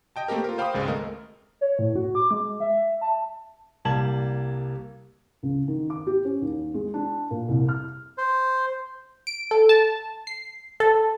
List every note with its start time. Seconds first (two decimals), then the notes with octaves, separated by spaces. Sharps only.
0.16 D#5 G5 A5
0.28 A3 A#3 C4 G4 A#4
0.44 F4 A#4
0.58 C5 F5 G5 B5 D6 D#6
0.74 G#1 C#2 G#3
0.87 A3 C4 A#4 D#5
1.61 C#5
1.79 A2
1.96 F#4
2.15 D6
2.31 G#3
2.60 E5
3.01 A5
3.85 C2 G3 A#3 A5 G#6 F#7
5.43 C#2
5.68 D#3
5.90 D6
6.07 G4
6.25 C#4
6.42 D#2
6.74 G#3
6.94 D4
7.31 A#2
7.49 C2
7.68 F6
8.18 C5
9.27 D7
9.51 A4
9.69 A5
10.27 C7
10.80 A4